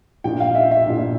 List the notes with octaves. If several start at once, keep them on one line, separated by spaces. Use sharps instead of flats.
A#1 A#2 G5
F5
E5
E5
A#1 A#2